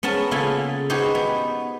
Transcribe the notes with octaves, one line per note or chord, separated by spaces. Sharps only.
B3 C#4 A#4 A5
C#3 A#3 F4 A4 G#5 B5
D#4 F#4 G4 B4 C5 G#5
B3